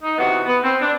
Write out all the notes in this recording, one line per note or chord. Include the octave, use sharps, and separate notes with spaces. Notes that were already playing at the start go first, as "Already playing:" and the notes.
D#4
C3 E3 B3 F#4
B3
C4
D4